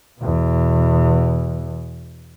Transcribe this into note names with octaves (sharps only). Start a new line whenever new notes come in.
E2 B2